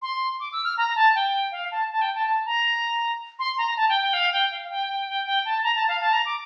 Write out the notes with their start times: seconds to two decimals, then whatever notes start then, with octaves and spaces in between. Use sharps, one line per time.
0.02 C6
0.40 D6
0.52 E6
0.64 F6
0.77 A#5
0.95 A5
1.15 G5
1.52 F5
1.71 A5
1.90 A5
2.01 G5
2.15 A5
2.27 A5
2.46 A#5
3.39 C6
3.58 A#5
3.77 A5
3.89 G5
4.02 G5
4.13 F5
4.32 G5
4.52 F5
4.70 G5
4.89 G5
5.07 G5
5.26 G5
5.45 A5
5.64 A#5
5.75 A5
5.88 F5
6.01 A5
6.13 A#5
6.25 D6